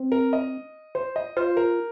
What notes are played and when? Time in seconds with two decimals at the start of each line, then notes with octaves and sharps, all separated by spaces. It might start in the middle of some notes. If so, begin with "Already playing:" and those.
Already playing: C4
0.12 A#4
0.33 D#5
0.95 C5
1.16 D#5
1.37 F4 C5
1.57 A#4